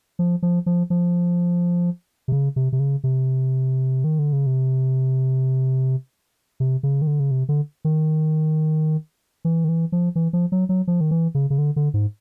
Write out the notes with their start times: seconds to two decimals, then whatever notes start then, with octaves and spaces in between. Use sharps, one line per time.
0.19 F3
0.43 F3
0.66 F3
0.90 F3
2.28 C3
2.32 C#3
2.56 C3
2.72 C3
2.80 C#3
3.04 C3
4.04 D#3
4.19 D3
4.33 C#3
4.46 C3
6.60 C3
6.83 C#3
7.02 D#3
7.07 D3
7.20 C#3
7.31 C3
7.49 D3
7.85 D#3
9.45 E3
9.64 D#3
9.69 E3
9.92 F3
10.16 E3
10.33 F3
10.52 F#3
10.69 F#3
10.87 F3
11.01 D#3
11.11 E3
11.35 C#3
11.50 C#3
11.58 D3
11.76 D3
11.94 G#2